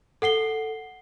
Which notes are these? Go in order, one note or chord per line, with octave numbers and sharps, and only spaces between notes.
A4 F#5 C7 G7